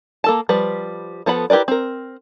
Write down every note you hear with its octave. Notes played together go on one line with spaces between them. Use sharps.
A#3 A4 A5
F3 G3 B4
F3 B3 A4 B5
E4 G4 A#4 B4 D5
C4 A#4